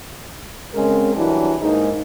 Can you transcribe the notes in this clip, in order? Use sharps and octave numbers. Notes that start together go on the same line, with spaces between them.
C#3 G#3 C4 A#4
E3 F#3 G3 D4
G#2 G#3 A#3 D#4